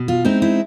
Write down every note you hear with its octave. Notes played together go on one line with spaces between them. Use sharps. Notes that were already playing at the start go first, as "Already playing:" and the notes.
Already playing: B2
F4
G#3 C4 D#4 E4
E4